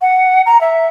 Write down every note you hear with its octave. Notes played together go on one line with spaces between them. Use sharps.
F#5
A#5
E5